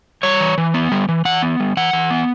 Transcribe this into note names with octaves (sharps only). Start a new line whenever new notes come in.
G3 C#5
E3
E3
B3
G3
E3
E3 F#5
B3
G3
E3 F#5
E3
B3